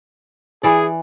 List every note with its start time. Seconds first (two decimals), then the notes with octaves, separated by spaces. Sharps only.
0.63 E3 G#4 D5